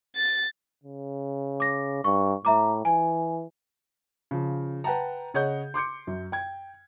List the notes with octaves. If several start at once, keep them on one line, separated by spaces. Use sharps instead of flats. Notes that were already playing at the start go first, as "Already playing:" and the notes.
A6
C#3
D6 A#6
G2 C#6
A2 E5 A#5 D6
E3 G#5
C#3 F3
B4 F#5 G5 A5 A#5
C#3 G#4 C#5 D#5 F#5 G6
C6 D6 G6 C#7
F#2
G5 G#6